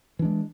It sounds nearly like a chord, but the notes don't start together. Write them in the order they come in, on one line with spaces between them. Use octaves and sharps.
E3 D4 G#3